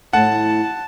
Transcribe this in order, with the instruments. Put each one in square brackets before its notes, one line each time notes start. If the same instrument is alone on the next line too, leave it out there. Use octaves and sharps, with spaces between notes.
[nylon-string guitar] A2 A3 [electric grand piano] F#5 [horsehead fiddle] A5